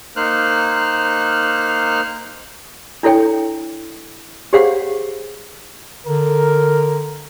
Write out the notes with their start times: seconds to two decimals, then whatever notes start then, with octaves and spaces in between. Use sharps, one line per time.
0.16 A#3 D#4 C5 F6 F#6
3.03 D4 E4 A4 C#5 G5
4.53 G4 G#4 C5 C#5 F5 F#5
6.06 D3 A#4